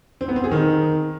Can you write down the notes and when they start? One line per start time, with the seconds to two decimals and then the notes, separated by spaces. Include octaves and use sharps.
0.21 C4
0.28 B3
0.36 C4
0.44 G#4
0.52 D#3